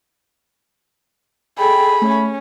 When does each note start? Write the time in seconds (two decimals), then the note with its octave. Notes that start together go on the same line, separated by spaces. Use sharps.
1.58 G#4 A4 G5 B5
2.02 A3 C#4